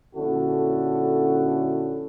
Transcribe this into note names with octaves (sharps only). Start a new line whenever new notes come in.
A#1 D3 C#4 E4 F#4 A4